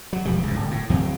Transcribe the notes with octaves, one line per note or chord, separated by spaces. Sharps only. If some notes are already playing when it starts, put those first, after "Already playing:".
F#3
E1 F3 G3
C#2 G#2
D1
A2
D2 F#3 C4